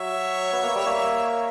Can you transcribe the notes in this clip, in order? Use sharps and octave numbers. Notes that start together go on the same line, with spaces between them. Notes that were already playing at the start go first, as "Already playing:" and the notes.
Already playing: F#3 C#5 E5
B3
A#3
G3
A#3